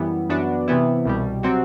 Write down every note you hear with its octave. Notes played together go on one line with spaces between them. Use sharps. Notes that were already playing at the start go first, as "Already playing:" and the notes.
Already playing: F#2 E3 G3 B3 E4
F#2 E3 B3 D4 F#4
C3 E3 B3 E4
C2 B2 G3
C3 F#3 C4 F#4